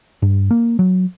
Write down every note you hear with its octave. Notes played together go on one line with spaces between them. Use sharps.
G2
A#3
F#3